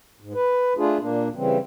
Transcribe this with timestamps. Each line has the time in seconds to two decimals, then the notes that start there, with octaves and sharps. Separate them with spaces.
0.21 G#2
0.34 B4
0.77 A3 D4 F4 G#4
1.01 A#2 A#3 D4
1.35 C#3 E3 G3 C4